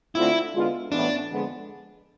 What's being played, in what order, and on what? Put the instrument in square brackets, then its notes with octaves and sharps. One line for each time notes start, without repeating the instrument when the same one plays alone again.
[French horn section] D3 A3 C4 F4 [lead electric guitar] E4
[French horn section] D3 G#3 B3 F4
[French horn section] A2 E3 B3 [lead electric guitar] D4
[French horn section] F2 D3 F3 G#3 B3